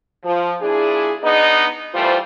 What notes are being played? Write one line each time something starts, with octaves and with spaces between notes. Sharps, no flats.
F3
A#2 D4 E4 G#4
B3 D4 D#4 D#5
E3 G3 A3 F4 C5